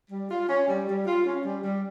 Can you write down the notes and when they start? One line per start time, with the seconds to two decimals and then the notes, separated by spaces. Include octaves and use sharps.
0.10 G3
0.30 F4
0.49 C#4
0.67 G3
0.87 G3
1.06 F4
1.25 C#4
1.44 G3
1.63 G3